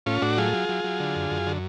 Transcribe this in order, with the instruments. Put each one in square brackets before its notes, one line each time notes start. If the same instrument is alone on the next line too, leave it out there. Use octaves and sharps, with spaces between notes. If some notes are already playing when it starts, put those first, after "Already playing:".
[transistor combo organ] A2 C#4 F4
A2 D4 F#4
F#3 F4 G#4
F#3
F#3
F#3
D3
F#2
F#2
D3